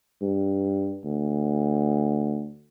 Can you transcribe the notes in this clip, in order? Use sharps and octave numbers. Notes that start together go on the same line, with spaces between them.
G2
D2